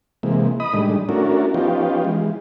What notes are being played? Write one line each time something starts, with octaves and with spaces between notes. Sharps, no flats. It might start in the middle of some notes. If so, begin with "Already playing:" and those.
C3 E3 G#3 A#3
D#5 B5 D#6
A2 D#3 G3 G#3 D4
A3 C#4 D4 E4 F#4 A#4
F3 B3 C#4 D#4 F4 G4
E3 G#3